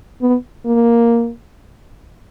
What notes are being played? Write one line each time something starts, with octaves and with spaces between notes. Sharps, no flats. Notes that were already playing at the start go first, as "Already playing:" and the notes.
B3
A#3